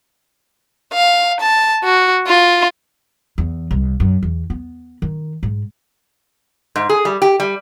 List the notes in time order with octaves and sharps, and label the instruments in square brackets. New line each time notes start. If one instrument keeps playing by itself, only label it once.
[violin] F5
A5
F#4
F4
[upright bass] E2
C2
F#2
E2
B3
D#3
G#2
[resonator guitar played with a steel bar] G#2
G#4
G3
G4
G3